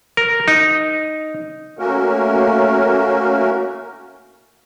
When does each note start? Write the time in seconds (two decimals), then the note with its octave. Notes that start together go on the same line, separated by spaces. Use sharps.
0.17 A#4
0.48 D#4
1.79 A3 A#3 C#4 F#4 A#4